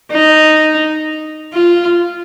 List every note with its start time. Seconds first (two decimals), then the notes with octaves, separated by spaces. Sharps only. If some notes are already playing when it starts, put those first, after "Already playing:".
0.12 D#4
1.53 F4